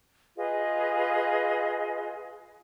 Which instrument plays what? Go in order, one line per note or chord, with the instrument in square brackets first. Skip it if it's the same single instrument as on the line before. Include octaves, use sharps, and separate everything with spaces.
[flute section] F4 G#4 B4 D#5